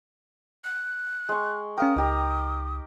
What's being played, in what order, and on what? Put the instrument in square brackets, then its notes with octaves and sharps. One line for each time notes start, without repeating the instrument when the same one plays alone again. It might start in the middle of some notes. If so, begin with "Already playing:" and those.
[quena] F#6
[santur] G#3 C#6
[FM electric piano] C#4 F5 G5 [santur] A#4 [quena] D#6
[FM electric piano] C#2 [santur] D#4 G4 A#5